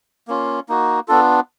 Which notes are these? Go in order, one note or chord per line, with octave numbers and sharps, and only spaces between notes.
A#3 C#4 F4
A#3 D#4 F#4
B3 D4 F4 A4